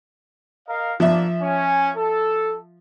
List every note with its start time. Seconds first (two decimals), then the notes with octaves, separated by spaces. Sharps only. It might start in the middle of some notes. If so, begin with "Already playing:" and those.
0.68 A#4 D#5 F5
1.00 F3 A#3 D4 F4 E5
1.41 C#4 G#5
1.97 A4